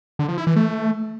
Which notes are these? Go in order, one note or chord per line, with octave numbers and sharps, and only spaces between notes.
D3
F3
E4
E3
A3